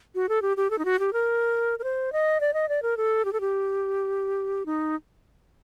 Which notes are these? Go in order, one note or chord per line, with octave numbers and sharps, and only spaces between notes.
F#4
A4
G4
G4
A4
D#4
F#4
G4
A#4
A#4
C5
D#5
D5
D#5
D5
A#4
A4
G4
A4
G4
D#4